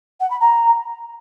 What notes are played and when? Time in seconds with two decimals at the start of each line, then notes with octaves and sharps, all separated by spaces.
0.20 F#5
0.30 B5
0.40 A#5